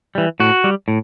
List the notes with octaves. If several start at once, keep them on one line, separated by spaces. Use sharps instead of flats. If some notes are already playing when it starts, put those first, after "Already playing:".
E3 G3
A2 F#4
G3
A2